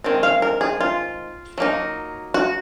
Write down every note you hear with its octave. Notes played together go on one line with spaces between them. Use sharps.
D#3 G#3 C4
F5
A#4
G#4
F4
F#3 A#3 D#4
F#4